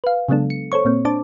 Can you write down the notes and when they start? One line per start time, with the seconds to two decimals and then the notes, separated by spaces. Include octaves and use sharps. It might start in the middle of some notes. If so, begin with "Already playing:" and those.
0.04 B4 F5
0.29 C#3 F#3 G#3 B3 D4 A4
0.50 C#7
0.72 A4 C5 C#5 C#6
0.85 A#2 A#3 C4
1.05 D4 C5 A5 D6